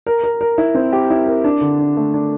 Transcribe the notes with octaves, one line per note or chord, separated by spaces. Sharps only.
A#4
A#4
A#4
E4
C4
G4
E4
A#4
D4
D3
D4
A3
D4